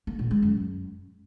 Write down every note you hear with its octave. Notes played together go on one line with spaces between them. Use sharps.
A#3
A#2
G#3
F#2